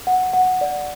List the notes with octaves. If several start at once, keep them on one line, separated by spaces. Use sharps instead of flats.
F#5
F#5
D5